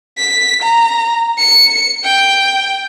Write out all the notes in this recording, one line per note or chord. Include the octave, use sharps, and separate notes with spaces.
B6
A#5
C#7
G5